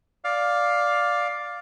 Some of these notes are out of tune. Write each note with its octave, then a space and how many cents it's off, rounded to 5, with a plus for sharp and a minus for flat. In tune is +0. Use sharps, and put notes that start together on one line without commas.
D5 +0 F5 +10